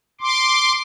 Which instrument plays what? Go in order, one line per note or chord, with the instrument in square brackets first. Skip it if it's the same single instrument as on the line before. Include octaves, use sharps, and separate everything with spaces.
[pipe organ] C6 D6